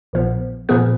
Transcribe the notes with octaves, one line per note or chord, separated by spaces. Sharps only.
A#1 A#2 F3 B3
A#2 F3 B3 G#4 B4